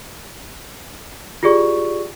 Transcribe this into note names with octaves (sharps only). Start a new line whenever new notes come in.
F4 G4 G#4 D5 C#6